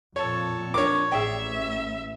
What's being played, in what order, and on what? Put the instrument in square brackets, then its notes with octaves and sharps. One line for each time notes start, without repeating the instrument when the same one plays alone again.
[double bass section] F2 A#2 [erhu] A4 [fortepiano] C#5
[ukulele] D4 A#4 [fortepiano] C#5 D6
[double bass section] A1 [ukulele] G#4 D5 G5 [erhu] E5